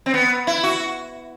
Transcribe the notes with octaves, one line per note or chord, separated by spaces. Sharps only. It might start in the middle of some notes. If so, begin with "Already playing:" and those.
C4
B3
E4
F#4